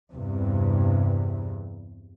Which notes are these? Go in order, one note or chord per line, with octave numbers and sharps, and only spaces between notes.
E2 G2 C3